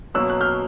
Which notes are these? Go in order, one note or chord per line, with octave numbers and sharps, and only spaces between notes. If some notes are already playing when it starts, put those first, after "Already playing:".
B2 F#3 A#3 C#4 E6 F#6
F#6
F6 G6